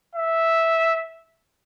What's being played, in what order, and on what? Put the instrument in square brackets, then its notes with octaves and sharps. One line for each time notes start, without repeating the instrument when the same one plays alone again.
[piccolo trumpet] E5